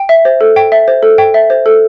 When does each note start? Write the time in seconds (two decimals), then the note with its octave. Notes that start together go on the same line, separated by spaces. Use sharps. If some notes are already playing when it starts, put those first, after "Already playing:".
Already playing: G5
0.09 E5
0.25 C5
0.41 A4
0.56 G5
0.72 E5
0.88 C5
1.03 A4
1.18 G5
1.34 E5
1.50 C5
1.66 A4